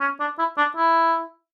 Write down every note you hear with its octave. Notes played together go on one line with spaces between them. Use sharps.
C#4
D4
E4
D4
E4